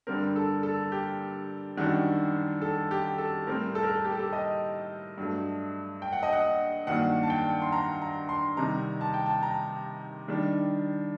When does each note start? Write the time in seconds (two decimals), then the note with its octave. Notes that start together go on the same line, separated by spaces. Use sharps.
0.07 G2 D3 G3 C4 A#4
0.36 A4
0.63 A4
0.92 G4
1.77 F#2 D#3 G3 D4 F#4
2.62 A4
2.91 G4
3.18 A4
3.47 A2 G3 C4 A#4
3.75 A4
3.83 A#4
3.90 A4
4.04 G4
4.12 A4
4.19 G4
4.33 D#5
5.18 G2 F#3 A3
6.02 G5
6.12 F#5
6.23 D#5
6.33 F#5
6.87 G2 D#3 F#3 A#3 D4 F#5
7.23 A5
7.30 G5
7.62 C6
7.72 A#5
8.02 A#5
8.29 C6
8.57 C3 D#3 G3 C4 D#4 A#5
9.01 A5
9.14 G5
9.26 A5
9.43 A#5
10.28 D#3 G3 D4